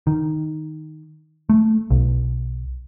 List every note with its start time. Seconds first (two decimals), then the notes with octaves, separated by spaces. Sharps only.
0.07 D#3
1.49 A3
1.90 B1